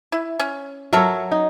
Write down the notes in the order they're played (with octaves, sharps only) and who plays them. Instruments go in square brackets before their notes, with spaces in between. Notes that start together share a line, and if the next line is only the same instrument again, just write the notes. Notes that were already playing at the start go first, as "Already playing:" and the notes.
[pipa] E4
C#4
[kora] F#3 C#5 [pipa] A4 A#4 E5
[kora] D#4